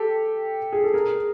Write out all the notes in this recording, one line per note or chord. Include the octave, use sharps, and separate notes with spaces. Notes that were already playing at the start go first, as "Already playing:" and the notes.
Already playing: G4 A4
G#4
A4
G#4 A#4